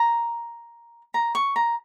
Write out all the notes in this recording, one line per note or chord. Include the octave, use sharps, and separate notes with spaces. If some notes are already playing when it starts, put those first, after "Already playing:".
Already playing: A#5
A#5
C#6
A#5